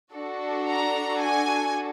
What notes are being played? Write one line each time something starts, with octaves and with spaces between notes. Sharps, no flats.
D4 F#4 A4
A#5
G#5